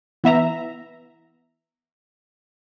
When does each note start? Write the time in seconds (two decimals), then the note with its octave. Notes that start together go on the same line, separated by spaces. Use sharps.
0.24 E3 B3 E5 A#5